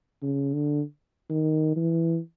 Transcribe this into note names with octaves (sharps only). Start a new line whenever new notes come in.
C#3
D3
D#3
E3